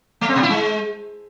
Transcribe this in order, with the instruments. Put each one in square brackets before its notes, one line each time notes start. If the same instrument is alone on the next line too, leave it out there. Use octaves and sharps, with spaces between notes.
[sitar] A3
C4
B2
E4
G#3